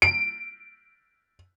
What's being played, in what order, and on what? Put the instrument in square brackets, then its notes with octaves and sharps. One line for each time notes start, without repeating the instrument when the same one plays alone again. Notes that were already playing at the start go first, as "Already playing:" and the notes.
[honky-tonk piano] D7